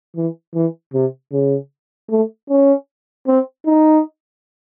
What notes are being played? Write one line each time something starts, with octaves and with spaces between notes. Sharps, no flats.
E3
E3
C3
C#3
A3
C#4
C4
D#4